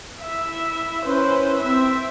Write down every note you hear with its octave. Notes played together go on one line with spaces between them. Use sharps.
E4 E5
C#4 E4 B4 C5
C4 E5